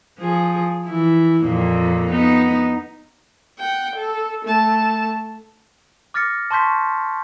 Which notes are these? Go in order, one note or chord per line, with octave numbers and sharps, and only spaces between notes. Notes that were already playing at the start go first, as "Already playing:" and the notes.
F3 G#4
E3 E4
F2 A#2 A#3
B3 D#4
F#5 G5
A4
A3 A5
D6 F6 A6 A#6 C#7
A5 C6 C#6 G6 B6